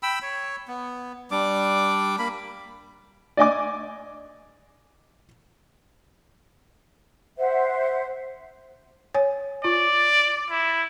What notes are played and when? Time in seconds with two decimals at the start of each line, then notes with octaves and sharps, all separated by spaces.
0.03 G5 B5 E6
0.22 C#5
0.68 B3
1.31 G3 D4 D6
2.19 A#3 B5
3.37 D5 D#5 G#5 D6
7.37 C5 E5 F#5
9.15 C#5 G#5
9.64 F4 D5
10.50 E4